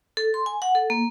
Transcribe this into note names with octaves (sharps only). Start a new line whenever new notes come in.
A4
C6
G#5
F#5
A4
A#3